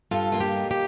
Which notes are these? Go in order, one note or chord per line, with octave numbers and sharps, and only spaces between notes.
G2 F4 A4
A#3 F4
G4
D#4
G4